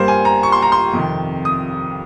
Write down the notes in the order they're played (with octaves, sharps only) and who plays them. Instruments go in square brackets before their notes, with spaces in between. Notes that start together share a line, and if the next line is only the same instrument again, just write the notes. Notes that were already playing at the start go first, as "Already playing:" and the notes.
Already playing: [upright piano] G2 G3 A#3 C5
G#5
A#5
C#6
C6
A#5
C6
F2 C3 D#3
D#6